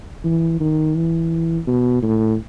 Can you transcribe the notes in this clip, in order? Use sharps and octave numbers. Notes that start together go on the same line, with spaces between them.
E3
D#3
E3
B2
A2